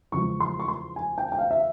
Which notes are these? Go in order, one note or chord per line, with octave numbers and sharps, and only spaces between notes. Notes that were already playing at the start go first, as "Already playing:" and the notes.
E2 C#3 F3 G#3 C#6
C6
C#6
C6
G#5
G5
G5
F5
E5